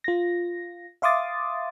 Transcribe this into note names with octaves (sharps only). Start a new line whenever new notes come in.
F4 A#6
E5 F5 C6 D6 D#6 A6